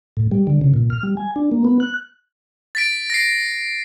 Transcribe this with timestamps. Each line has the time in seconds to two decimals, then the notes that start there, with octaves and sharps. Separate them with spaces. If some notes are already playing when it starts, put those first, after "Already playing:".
0.17 A2
0.31 G3
0.47 D3
0.61 C#3
0.74 A#2
0.90 F6
1.03 G3
1.17 G#5
1.36 D4
1.52 A#3
1.65 B3
1.80 F#6
2.75 A6 B6 D7
3.10 A#6 C7